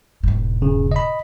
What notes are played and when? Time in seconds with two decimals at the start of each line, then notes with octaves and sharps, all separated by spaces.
0.23 E1 G#2
0.62 C#3
0.92 D#5 B5